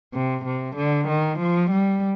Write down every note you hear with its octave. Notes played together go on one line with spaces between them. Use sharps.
C3
C3
D3
D#3
F3
G3